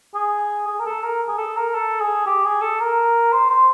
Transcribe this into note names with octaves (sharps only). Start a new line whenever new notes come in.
G#4
G#4
A#4
A4
A#4
G#4
A4
A#4
A4
G#4
G4
G#4
A4
A#4
C5
C5